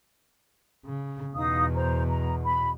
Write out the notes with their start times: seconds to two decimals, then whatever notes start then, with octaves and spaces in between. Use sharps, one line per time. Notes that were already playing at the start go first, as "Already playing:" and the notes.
0.85 C#3
1.36 E2 B2 D#4 F5 D#6
1.74 C5 A#5
2.08 A#5
2.44 B5